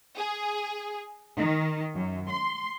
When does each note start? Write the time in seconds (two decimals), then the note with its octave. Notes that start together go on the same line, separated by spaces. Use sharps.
0.18 G#4
1.35 D#3
1.96 F#2
2.30 C6